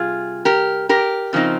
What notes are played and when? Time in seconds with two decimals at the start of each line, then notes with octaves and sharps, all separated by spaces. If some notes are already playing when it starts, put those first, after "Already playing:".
Already playing: C3 G3 F4 G#4
0.45 G4 A#4
0.89 G4 A#4
1.33 C#3 F3 C4 D#4